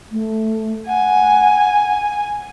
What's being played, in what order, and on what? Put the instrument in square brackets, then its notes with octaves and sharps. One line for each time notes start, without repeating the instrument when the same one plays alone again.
[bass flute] A3
[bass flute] F#5 [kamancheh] G#5